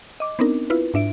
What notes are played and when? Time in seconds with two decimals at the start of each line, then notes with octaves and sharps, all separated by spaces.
0.20 D#5 D6
0.39 B3 C4 D4 D#4 A#4
0.70 E4 F4 B4
0.94 G#2 D4 E5 D7